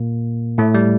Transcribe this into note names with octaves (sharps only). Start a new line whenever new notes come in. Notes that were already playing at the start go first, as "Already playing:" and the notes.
Already playing: A#2 A#3
A2 A3
G3